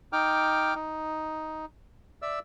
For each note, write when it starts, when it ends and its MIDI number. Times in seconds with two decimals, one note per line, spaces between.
0.13 0.74 63
0.13 0.74 79
0.13 0.74 86
0.13 0.74 89
0.75 1.65 63
2.22 2.39 74
2.22 2.39 76
2.22 2.39 88